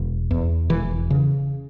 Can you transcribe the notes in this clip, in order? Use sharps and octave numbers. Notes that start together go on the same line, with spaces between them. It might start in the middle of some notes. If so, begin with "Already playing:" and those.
Already playing: E1
E2
E1 E3
C#3